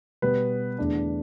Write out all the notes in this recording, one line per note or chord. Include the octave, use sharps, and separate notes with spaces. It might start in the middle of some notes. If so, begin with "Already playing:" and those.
B2 G3 B3 B4
E2 D3 A3 D4